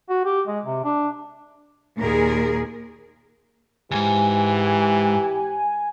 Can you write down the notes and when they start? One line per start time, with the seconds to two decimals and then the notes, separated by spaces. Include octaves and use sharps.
0.09 F#4
0.25 G4
0.47 G#3
0.65 C3
0.84 D4
1.98 D#2 A#2 G#4 A#4
3.91 D2 G#2 E3 G4 G#5